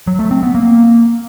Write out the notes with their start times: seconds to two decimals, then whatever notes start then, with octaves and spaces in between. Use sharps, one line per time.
0.07 F#3
0.19 A3
0.31 C4
0.43 B3
0.55 A#3